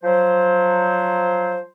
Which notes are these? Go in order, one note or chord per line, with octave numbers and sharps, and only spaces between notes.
F3 F#3 C5